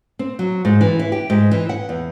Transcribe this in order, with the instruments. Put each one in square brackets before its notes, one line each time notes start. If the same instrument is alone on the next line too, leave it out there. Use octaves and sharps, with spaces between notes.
[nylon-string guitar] C4
F#3
G#2
E3
E4
G4
G#2
E3
F#5
E2